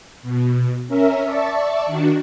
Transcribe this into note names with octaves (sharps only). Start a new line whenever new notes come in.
B2
C#4 A#4 E5
D5 E5 A5 C#6
D#3 D4 F#4